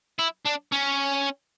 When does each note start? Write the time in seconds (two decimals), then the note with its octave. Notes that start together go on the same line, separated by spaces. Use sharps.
0.19 E4
0.46 D4
0.72 C#4